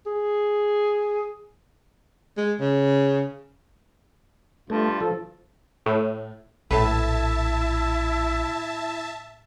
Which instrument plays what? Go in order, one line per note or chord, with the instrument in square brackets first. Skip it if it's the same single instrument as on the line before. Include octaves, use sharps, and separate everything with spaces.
[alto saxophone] G#4
[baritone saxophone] G#3
C#3
[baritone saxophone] G2 [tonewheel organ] A3 [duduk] F4
[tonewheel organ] F3 [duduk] A4
[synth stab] A2
[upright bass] A#1 [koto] A2 B4 [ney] E4 [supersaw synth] E5 A5